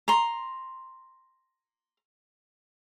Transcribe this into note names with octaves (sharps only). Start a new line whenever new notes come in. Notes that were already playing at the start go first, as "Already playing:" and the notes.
A#5 C6